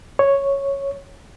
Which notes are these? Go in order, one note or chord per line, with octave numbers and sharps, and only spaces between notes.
C#5